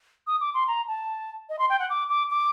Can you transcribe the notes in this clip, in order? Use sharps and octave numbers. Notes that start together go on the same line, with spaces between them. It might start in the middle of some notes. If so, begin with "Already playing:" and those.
D#6
D6
C6
A#5
A5
D#5
C6
G5
F#5
D6
D6
D6